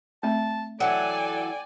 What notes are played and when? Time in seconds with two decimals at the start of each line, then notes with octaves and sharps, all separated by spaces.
0.23 A3 C4 E5 A5
0.80 E3 F#3 A4 D5 G5 G#5